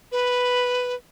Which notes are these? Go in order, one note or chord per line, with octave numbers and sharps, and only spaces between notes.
B4